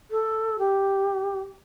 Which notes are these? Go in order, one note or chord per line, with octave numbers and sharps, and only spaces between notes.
A4
G4